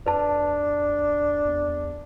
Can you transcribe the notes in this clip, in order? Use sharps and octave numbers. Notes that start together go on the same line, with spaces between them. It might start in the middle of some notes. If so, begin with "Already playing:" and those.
F2 D4 B4 A5
E2